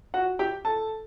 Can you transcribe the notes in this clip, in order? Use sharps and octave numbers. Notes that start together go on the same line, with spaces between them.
F#4 F#5
G4 G5
A4 A5